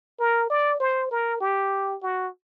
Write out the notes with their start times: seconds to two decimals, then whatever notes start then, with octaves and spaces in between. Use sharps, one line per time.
0.20 A#4
0.50 D5
0.80 C5
1.11 A#4
1.41 G4
2.02 F#4